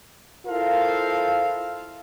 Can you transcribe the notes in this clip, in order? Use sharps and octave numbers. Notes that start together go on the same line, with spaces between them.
E4 F4 A4 A#4 C5 F5